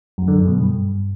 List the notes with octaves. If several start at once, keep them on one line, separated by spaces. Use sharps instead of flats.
F#2
D3
F#2
B2
G2